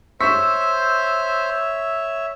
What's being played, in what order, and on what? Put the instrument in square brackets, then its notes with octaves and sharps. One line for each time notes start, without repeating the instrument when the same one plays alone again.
[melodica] C5 [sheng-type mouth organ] C#5 E5 [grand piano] C#6 B6 [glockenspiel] E6 E7